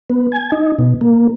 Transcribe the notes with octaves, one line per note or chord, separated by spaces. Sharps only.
B3
G#5
D#4
B2
A#3